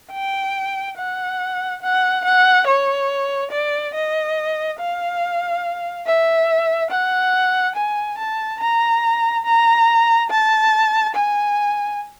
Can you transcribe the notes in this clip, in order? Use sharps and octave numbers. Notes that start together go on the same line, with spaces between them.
G5
F#5
F#5
F#5
C#5
D5
D#5
F5
E5
F#5
G#5
A5
A#5
A#5
A5
G#5